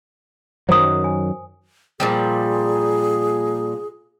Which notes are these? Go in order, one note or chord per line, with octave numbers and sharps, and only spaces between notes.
F#2 D#3 F#3 C5 D#6
G#5
A#2 F3 G3 G#4